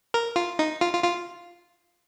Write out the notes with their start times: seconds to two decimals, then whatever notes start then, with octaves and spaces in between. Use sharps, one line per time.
0.14 A#4
0.36 F4
0.59 D#4
0.81 F4
0.93 F4
1.04 F4